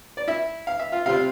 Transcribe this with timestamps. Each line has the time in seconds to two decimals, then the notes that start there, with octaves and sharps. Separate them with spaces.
0.17 D5
0.28 E4 E5
0.67 F5
0.79 E5
0.92 F4 F5
1.06 C3 G3 C4 F4 F5